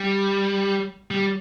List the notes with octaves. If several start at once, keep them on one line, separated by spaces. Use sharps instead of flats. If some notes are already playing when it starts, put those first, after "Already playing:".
Already playing: G3
G3